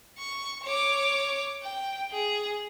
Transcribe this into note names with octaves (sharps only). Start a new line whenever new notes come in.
C#6
C#5 D6
G5
G#4